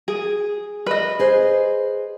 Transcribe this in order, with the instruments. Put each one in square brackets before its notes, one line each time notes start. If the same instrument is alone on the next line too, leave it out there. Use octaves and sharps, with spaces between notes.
[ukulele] G#4
B4 D#5
[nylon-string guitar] G#4 C5